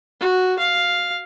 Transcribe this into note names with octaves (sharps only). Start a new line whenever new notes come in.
F#4
F5